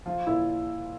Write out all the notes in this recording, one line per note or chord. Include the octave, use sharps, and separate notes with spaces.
F3 F4
A#2 E4